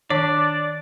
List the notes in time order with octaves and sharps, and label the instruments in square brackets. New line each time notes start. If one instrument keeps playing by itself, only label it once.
[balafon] D#3 C#5 [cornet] D4 [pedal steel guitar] D5